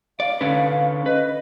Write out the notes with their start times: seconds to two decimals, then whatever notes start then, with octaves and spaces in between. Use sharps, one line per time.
0.20 D5 F5
0.41 D3 C#4 B4
1.06 B4 D#5